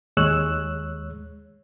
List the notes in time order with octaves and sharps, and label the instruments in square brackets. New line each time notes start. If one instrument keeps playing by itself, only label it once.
[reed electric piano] D#2 G#3 C#5 E6 F#6